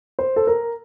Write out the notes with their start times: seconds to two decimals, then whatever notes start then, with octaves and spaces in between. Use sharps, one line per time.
0.19 C5
0.36 A4
0.47 A#4